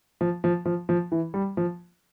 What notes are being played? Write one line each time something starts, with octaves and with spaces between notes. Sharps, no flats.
F3
F3
F3
F3
E3
G3
F3